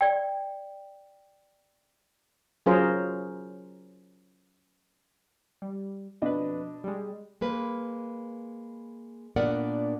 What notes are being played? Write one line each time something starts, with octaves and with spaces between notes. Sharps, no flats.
D5 G5
F#3 C#4 F4 G#4 A#4 C5
G3
F2 B2 D4 B4 D#5
G3 G#3
G#3 A#3 B4
A#2 B3 D4 A#4 D5 F#5